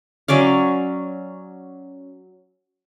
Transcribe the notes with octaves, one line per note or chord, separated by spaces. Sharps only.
F#3 C#4 D5 F5